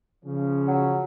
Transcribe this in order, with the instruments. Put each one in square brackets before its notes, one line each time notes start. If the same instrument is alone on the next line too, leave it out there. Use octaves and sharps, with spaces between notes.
[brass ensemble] C#3 F3 C#4
[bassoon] F#3